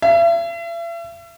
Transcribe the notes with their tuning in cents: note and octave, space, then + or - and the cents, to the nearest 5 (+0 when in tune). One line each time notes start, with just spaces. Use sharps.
E5 +40